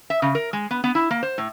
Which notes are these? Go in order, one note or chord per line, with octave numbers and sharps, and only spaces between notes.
E5
C#3
A#4
G#3
B3
B3
E4
A#3
C5
A2